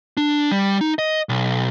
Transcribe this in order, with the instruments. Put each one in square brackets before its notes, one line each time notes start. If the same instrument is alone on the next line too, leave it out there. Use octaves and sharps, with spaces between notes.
[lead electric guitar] D4
G3
D#4
D#5
B1